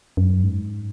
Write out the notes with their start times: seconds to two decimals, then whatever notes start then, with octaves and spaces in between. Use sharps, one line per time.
0.17 F#2
0.43 G#2